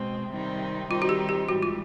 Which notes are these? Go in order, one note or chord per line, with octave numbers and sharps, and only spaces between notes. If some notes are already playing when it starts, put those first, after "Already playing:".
Already playing: B2 G#3 C4
C3 D#3 G3 C4 D#4
D#3 G3 C4 D#4 F4
F#4
G4
G4
G#2 E3 G3 F#4
F4